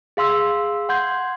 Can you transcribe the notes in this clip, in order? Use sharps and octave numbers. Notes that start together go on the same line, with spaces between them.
G#4 F5 C6 E6
F#5 C6 G6 G#6